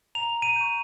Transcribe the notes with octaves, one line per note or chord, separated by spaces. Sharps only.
A#5 F7
D#7
C#6 G6